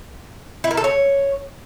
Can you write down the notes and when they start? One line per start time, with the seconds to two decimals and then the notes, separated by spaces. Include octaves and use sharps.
0.64 E4
0.71 A#4
0.77 A4
0.84 C#5